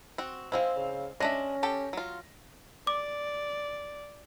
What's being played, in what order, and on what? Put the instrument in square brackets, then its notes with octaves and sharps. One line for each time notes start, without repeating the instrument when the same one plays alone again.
[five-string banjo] C4 F#4
[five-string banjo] G#3 C4 E4 [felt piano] C5 F5
[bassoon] C#3
[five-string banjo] G#3 D4 E5 [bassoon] C#4 [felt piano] A#6
[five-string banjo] G4 A4 A5
F#3 F4
[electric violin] D5 [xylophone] D6